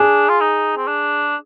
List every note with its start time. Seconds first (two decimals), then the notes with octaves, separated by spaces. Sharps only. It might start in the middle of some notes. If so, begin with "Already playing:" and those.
Already playing: D4 G#4
0.29 F4
0.41 D#4
0.77 C4
0.87 D4